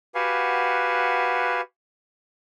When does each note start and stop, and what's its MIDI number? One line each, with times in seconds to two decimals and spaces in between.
0.15 1.61 66
0.15 1.61 67
0.15 1.61 71
0.15 1.61 77
0.15 1.61 78
0.15 1.61 80